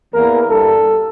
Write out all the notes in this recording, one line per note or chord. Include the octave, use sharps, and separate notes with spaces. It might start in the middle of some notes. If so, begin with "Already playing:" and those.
E2 E3 A#3 A#4
G2 A4